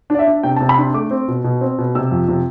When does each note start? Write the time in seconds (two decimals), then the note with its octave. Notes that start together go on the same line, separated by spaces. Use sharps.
0.10 D4 D5
0.19 E5
0.27 D4
0.43 C3 G5
0.56 A5
0.61 C3
0.69 B5
0.78 D4 C6
0.94 A3 D6
1.11 C4
1.28 B2
1.44 B2
1.61 C4
1.78 B2
1.95 C3 E6
2.11 F2
2.29 C3